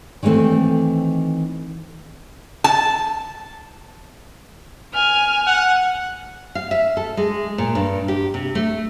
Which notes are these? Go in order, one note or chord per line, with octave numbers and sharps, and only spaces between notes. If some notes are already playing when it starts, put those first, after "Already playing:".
D#3 E3 G3 A3 C4
A5
G#5 F6
F#5
F5
E5
A4
G#3
A#2
G2
G4
C3
A3